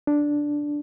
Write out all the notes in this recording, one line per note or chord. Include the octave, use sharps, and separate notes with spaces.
D4